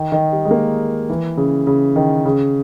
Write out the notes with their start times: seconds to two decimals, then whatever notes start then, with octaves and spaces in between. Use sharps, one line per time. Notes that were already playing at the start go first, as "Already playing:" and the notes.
Already playing: D#3
0.12 D#3
0.32 G3
0.45 G#3
0.51 A#3
1.10 E3
1.37 C#3
1.67 C#3
1.96 D#3
2.25 C#3